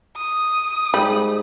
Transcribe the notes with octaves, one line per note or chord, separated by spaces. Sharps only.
D#6
G#2 G3